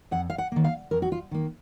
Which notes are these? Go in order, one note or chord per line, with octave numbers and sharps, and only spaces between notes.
F2 F#5
F5
F#5
D#3 A#3
F5
F2 A#4
F#4
F4
D#3 A#3